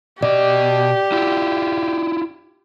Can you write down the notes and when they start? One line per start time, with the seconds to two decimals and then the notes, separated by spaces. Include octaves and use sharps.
0.23 B2 G4 D5 D#5
1.12 E4 F4